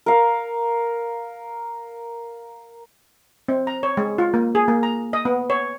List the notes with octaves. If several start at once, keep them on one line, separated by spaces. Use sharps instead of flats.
A#4 F5
C4
A#5
C#5
G#3
F4
A#3
G#4
A#3
A#5
D#5
B3
C#5